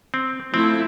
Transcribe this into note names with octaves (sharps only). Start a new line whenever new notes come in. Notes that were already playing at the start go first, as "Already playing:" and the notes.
C4
F3 A3 C4 E4